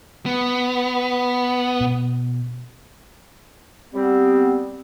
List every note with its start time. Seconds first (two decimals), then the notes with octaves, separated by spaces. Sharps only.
0.26 B3
1.81 B2
3.94 G3 B3 C4